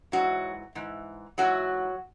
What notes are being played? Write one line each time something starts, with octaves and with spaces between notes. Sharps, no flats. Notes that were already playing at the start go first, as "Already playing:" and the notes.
G#2 E3 F#3 F#4
G#2 E3
G#2 E3 F#3 F#4